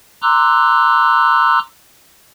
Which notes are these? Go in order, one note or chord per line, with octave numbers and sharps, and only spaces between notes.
A#5 C6 D6 E6 F#6